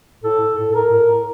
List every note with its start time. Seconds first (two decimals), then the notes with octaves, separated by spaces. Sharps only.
0.23 A2 A4
0.40 A2
0.57 A2
0.71 A4
0.75 A2 A#4
0.92 A2
1.10 A2